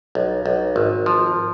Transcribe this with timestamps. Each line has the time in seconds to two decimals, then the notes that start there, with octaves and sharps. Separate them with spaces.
0.15 B1
0.46 B1
0.76 G#1
1.06 F3